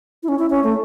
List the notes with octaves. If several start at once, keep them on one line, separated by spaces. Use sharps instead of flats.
E4
C#4
E4
C#4
A3